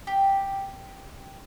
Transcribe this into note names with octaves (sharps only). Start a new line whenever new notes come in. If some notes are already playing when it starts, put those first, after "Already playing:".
G4